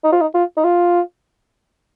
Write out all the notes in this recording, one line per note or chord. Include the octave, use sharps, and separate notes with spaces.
D#4
F4
D#4
F4
D#4
F4